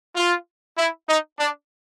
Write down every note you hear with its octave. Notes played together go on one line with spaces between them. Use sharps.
F4
E4
D#4
D4